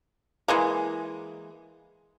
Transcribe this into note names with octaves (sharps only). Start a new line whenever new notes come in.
E3 G#3 A#3